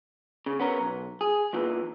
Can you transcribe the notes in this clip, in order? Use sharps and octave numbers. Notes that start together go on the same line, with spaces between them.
C#3
B3 C#4 A#4
B1
G#4
E2 A#2 E3